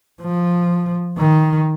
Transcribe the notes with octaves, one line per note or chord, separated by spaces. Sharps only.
F3
D#3